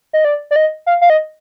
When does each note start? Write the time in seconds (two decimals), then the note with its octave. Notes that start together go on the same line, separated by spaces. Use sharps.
0.13 D#5
0.25 D5
0.51 D5
0.56 D#5
0.86 F5
1.01 F5
1.10 D#5